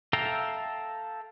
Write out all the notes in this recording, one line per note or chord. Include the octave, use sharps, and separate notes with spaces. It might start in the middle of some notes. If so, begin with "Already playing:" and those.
A4 E5 F5 G5 A#5